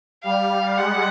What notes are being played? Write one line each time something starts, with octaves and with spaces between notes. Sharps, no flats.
G3 F5
G#3 F#5